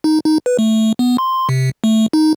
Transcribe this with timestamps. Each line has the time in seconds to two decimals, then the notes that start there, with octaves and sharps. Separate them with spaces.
0.04 D#4
0.25 D#4
0.46 B4
0.59 A3
0.99 B3
1.18 C6
1.49 C3
1.84 A3
2.13 D#4